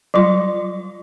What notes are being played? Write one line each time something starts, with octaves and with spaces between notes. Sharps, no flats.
F#3 G3 F4